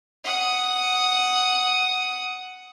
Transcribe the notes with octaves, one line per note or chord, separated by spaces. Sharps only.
F#5 D#6